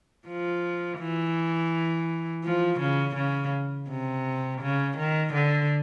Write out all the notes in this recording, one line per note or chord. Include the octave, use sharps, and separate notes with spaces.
F3
E3
F3
C#3
C#3
C3
C#3
D#3
D3